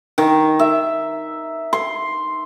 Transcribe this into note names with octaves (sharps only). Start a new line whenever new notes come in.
D#3
E5
C6